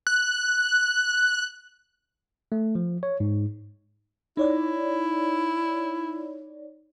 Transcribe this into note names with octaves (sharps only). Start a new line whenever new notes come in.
F#6
A3
F3
C#5
G#2
D#4 E4 C#5 D5